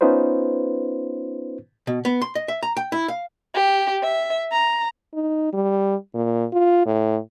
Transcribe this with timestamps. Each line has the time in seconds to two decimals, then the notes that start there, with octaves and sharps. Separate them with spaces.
0.01 B3 C#4 D#4 F4 B4 C5
1.87 B2
2.05 B3
2.22 C6
2.35 D#5
2.48 E5
2.63 A#5
2.77 G5
2.92 E4
3.08 F5
3.54 G4
4.03 E5
4.51 A#5
5.14 D#4
5.53 G3
6.15 A#2
6.53 F4
6.86 A2